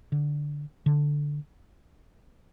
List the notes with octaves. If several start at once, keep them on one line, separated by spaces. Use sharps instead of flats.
D3
D3